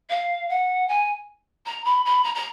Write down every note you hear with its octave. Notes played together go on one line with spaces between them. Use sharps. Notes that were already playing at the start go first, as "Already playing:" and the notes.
F5
F#5
G#5
A#5
B5
B5
A#5
A#5